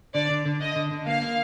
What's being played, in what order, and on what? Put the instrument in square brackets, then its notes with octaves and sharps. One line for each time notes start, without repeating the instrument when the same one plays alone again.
[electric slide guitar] D3 [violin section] D5
[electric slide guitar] D3
D3
[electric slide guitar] D3 [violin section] D#5
[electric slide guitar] D3
D3
[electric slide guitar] A#3 [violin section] F5
[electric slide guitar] A#3